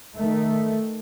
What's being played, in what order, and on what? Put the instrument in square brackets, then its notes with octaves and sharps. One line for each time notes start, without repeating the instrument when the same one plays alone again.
[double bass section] D#3 A3